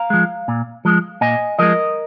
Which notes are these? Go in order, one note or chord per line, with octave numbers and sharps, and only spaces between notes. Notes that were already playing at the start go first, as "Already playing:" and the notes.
Already playing: F5 A#5
F3 G#3
A#2
F3 G#3
A#2 D#5 G#5
F3 G#3 A#4 D#5